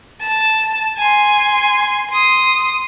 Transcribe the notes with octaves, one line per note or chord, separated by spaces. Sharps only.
A5
G#5 C6
C6 D#6